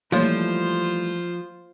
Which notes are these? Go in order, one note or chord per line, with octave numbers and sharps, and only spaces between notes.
E3 F3 G3 A3 A#3 F4 C5 C#5